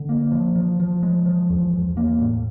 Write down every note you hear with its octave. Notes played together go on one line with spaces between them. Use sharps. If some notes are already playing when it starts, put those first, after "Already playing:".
Already playing: D3
A#3
F3
F3
F3
G#3
F3
E2
E2
A#3
A2